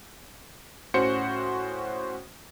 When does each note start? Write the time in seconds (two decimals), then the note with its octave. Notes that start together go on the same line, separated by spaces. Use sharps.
0.94 A2 C#4 F#4 C5 C#7